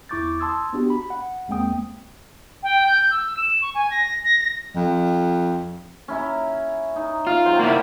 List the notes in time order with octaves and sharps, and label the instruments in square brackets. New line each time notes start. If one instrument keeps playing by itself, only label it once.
[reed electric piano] E2 E4 C#6 D6 G6 A6
A5 C6 D#6 E6 G#6 A6
B3 D4 F#4 G4
B5
F#5
E2 G#3 A#3 C4 G5 D#6
[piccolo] G5
G6
E6
E7
C#6
G#5
A#6
A#6
A#6
[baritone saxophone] F2
[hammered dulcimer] C#4 E4 A#5
D#4
[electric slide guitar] F4 [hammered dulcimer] F5
[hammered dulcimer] F#3 C4 C5
[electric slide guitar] A#3 E4 [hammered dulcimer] D5